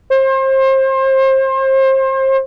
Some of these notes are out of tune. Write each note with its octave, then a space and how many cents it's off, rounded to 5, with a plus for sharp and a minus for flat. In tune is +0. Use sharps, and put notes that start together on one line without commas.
C5 +30